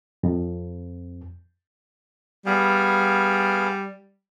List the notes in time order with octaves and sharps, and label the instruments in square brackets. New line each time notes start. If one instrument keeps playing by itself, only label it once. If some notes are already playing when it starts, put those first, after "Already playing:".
[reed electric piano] F2
[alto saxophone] G3 [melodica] B3 G#4 F5